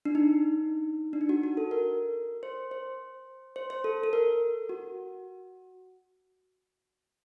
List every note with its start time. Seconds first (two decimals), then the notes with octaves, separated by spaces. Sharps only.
0.05 D4
0.15 D#4
1.13 D4
1.21 D#4
1.29 F#4
1.43 F#4
1.57 A4
1.71 A#4
2.43 C5
2.71 C5
3.56 C5
3.70 C5
3.84 A4
4.03 A4
4.13 A#4
4.69 F#4